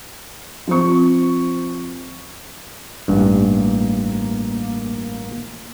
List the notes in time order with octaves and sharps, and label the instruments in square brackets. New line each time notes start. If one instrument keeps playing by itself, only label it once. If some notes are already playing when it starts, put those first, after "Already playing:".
[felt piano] F3 C4 C#6
[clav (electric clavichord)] A1 G2 [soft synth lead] A#3